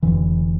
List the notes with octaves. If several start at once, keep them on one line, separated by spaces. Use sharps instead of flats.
F1 F2 D3 E3